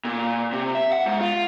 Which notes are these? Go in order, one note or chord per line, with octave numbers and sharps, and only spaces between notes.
A#2
C3
E5
F#5
G#2
F4